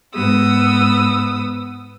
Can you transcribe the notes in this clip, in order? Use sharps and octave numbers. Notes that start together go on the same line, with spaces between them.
G#2 B3 D#6 E6